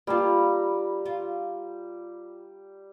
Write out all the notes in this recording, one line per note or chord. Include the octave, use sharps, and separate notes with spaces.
G3 A#3 F4 A#5
F4